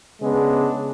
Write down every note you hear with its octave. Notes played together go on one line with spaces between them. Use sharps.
C#3 G#3 B3 D4